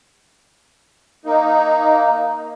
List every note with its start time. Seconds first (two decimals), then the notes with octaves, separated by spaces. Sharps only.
1.25 A#3 D#4